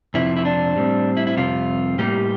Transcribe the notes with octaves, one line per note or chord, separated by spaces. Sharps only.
F2 C3 F3 E4
E4
D4
A2 G3 C4
E4
E4
F2 C3 G3 F4
A2 G3 A#3 G4